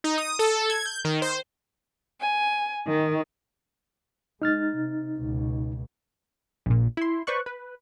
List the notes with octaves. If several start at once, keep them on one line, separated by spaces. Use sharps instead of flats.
D#4
D#6
A4
G#6
G6
D#3
C5
G#5
D#3
G#3 D#4 F6 A6
C3
C#2 B2
A#1 A#2
E4 C6
B4 C5 D5 C#6 F#6
B4